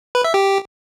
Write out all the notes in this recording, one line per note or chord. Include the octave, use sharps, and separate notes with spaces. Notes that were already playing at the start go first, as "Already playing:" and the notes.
B4
E5
G4